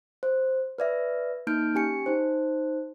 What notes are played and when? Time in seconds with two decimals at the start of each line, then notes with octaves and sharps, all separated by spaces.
0.23 C5
0.78 B4 D5 E5
1.47 A#3 D#4 F6 G6 D7
1.75 C#4 G4 G#5 C#7
2.06 D#4 C5